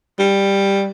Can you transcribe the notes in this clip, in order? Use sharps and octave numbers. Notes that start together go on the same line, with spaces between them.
G3